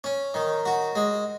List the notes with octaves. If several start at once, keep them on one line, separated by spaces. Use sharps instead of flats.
C#4
D#3
F#4
G#3